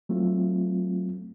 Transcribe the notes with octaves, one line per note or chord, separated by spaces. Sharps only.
F#3 A3 C4 F4